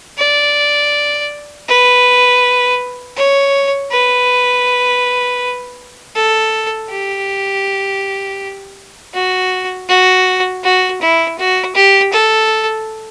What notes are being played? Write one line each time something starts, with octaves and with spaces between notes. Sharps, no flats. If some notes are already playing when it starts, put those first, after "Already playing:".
D5
B4
C#5
B4
A4
G4
F#4
F#4
F#4
E4
F#4
G4
A4